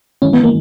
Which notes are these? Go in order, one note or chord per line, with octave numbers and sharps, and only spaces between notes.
G#1 F#2 E3 G#3 C#4
B3
A#3